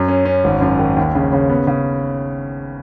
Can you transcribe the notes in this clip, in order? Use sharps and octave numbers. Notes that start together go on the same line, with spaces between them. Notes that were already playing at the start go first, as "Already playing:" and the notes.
Already playing: F#2
C#4
C#4
G#1
F#2
D#3
D#2
C#3
C#3
B3
C#3